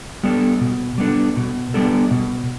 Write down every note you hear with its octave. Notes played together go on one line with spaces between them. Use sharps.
G3 B3 D4 A4
B2
G3 B3 D4 A4
B2
G3 B3 D4 A4
B2